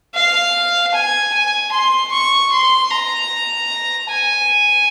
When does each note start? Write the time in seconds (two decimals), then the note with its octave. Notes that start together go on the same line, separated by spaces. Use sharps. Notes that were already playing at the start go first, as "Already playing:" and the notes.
0.15 F5
0.93 G#5
1.33 G#5
1.72 C6
2.12 C#6
2.52 C6
2.91 A#5
4.09 G#5